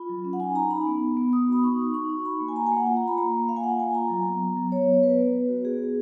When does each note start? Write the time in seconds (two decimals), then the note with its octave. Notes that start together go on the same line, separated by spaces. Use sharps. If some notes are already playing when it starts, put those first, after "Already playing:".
Already playing: F4 B5
0.09 F#3
0.24 C#4
0.33 F#5
0.40 D#4 G#5
0.55 D#4 A#5
0.71 D#4 B5
0.87 B3
1.02 B3
1.17 B3
1.33 B3 D#6
1.48 F#4 B5
1.63 D#4 C#6
1.79 F#4
1.94 D#4 C#6
2.10 D#4
2.25 F#4 B5
2.40 A#3
2.48 G#5
2.56 A#3 A#5
2.66 G#5
2.72 A#3 F#5
2.87 F4 F#5
2.97 A#5
3.03 F4
3.08 B5
3.18 A#3 A#5
3.33 A#3
3.49 A#3 F5
3.56 G#5
3.64 F4 F#5
3.79 A#3 G#5
3.95 F4 A#5
4.10 F#3
4.26 B3
4.41 B3
4.57 F#3
4.72 B3 C#5
4.88 B3
4.93 C#5
5.03 B3 B4
5.18 B3
5.34 B3
5.49 F#4
5.65 B3 G#4
5.80 B3